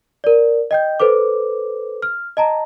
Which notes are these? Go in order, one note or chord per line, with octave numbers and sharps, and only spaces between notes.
A#4 D5
D#5 G5 G6
A4 B4 C5 D6
F6
D#5 A5 A#5